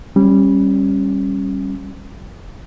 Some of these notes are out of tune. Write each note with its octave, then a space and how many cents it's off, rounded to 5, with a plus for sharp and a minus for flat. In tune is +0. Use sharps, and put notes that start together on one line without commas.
G3 +0 C#4 -20